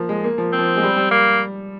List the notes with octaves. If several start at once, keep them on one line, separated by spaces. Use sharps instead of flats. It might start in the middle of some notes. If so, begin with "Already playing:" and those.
Already playing: F3 A#3
G#3
A#3
F3
C4
F3
G#3
G3
G3
A#3